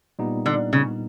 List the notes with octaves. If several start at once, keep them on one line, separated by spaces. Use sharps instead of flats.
A#2 G3 B3 D#4
D3
C#3